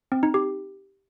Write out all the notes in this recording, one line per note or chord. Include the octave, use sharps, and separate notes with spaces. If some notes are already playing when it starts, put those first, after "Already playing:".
C4
D#4
G4